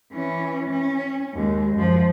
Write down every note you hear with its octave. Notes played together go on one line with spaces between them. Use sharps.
E3 C#4
C#4
D#2 G#3
F#2 F3